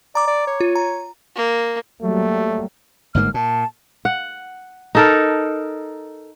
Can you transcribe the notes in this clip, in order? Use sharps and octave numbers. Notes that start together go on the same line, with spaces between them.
D5 A#5 D6
D5
C#5
F4
A#5
A#3
F#3 G3 A3 A#3
G1 G#2 A#3 F6
A#2 A5
F#5
D#4 A4 A#4